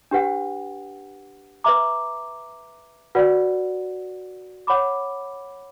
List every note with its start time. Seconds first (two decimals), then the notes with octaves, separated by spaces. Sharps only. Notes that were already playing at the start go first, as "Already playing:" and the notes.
0.11 D4 G4 B4 F#5
1.64 B4 E5 A#5 D6
3.15 F#4 B4 D5 F#5
4.67 C#5 F#5 B5 D6